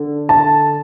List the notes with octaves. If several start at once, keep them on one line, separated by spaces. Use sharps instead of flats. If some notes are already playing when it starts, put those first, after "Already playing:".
Already playing: D3
A5